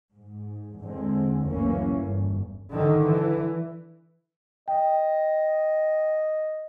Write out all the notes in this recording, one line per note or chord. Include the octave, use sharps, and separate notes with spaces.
G#2
E2 D3 G#3 C4
F#1 D2 E3 A#3 C#4
G1 E2
D3 D#3
E3
D#5 G5